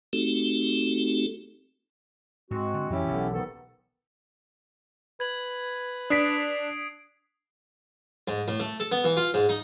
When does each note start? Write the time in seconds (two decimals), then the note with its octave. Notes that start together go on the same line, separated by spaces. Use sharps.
0.13 A3 C4 D#4 F#4 G4 A4
2.51 G#2 G#3 C4 F#4
2.74 D3
2.90 F2 E3 G3 C#4 E4 G4
3.07 E1 B1 D3
3.32 G#2 D#3 B3 A4
5.20 B4 G#6 F#7
6.10 D4 D#6 B6 C7 D7
8.28 G#2
8.48 A2
8.60 A3
8.80 A4
8.92 B3
9.04 E3
9.17 F4
9.34 G#2
9.49 D#4